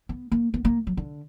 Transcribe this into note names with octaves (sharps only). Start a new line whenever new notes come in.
B3
A#3
B3
A#3
F#3
D3